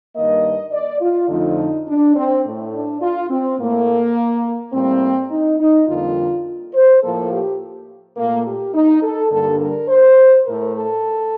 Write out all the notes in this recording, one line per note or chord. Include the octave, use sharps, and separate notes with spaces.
G2 D#3 A#3 D#5
D5
F4
F2 D3 F3 A3 D#4
D4
C4
A2 A3
D4
F4
C4
A2 A3 A#3
A2 G3 A#3 C4
D#4
D#4
F2 D3 G3 A#3 F4
C5
A2 F3 A#3 A4
G4
A#2 A3 A#3
G4
D#4
A4
G2 D3 G3 A#3 A4
A#4
C5
A2 A3 A#4
A4